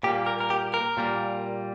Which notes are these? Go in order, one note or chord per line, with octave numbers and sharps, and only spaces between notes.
A#2 G3 A#3 G4
A#4
A#4
G4
A#4
A#2 G3 A#3